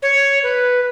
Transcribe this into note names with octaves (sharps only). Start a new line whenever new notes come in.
C#5
B4